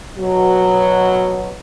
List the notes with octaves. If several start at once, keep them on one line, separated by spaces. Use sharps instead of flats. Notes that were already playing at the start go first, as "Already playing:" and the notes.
B2 F#3